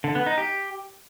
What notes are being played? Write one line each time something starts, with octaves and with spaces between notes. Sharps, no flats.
D3
B3
D#4
G4